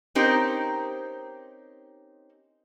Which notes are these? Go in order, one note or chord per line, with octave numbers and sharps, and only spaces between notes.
C4 C#4 D#4 G4 A#4 C5